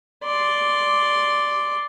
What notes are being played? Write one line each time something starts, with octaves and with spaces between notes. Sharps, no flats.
D5 C6